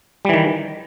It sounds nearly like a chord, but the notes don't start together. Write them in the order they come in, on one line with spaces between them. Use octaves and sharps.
G3 E3 D#3